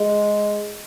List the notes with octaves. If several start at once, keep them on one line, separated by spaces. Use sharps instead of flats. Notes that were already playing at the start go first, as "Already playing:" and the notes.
Already playing: G#3